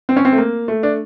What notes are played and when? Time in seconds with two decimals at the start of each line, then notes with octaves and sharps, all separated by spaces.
0.09 C4
0.16 C#4
0.25 C4
0.32 A3
0.38 A#3
0.68 A3
0.83 D4